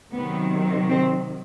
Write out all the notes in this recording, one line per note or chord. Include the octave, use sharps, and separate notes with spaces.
C3 D#3 F#3 B3
C4